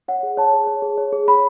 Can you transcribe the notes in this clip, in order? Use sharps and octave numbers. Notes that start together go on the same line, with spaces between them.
C#5 F#5
G#4
C#5 A5
G#4
C#5
G#4
C#5
G#4
C#5 B5